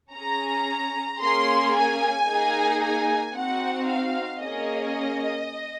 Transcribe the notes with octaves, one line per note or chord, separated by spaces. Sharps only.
C#4 G#4 A#5
A#3 C#4 G#4 C6
G#5
A#3 D#4 G#4
G#5
C4 D#4 F#4 F#5
F5
A#3 C#4 G#4 D#5